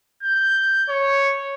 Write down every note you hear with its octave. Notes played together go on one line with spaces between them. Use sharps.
G6
C#5